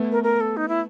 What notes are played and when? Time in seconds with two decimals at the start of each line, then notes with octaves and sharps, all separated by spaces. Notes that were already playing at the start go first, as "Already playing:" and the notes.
Already playing: A3 B3
0.12 A#4
0.24 A#4
0.41 A4
0.57 D#4
0.69 E4